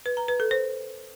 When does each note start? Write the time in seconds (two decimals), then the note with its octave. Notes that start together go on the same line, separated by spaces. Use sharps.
0.06 B4
0.17 A#5
0.28 B4
0.40 A4
0.51 C5